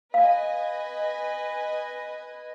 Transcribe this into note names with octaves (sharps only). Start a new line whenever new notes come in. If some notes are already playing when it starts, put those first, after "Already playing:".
B4 D#5 F5 G#5